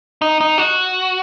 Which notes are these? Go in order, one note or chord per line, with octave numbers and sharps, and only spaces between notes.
D#4
D#4
F#4